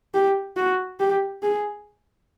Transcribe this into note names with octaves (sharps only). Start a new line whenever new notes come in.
G4
F#4
G4
G#4